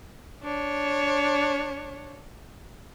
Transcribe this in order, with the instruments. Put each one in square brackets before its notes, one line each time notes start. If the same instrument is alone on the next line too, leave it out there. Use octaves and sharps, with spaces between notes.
[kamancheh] D4 C#5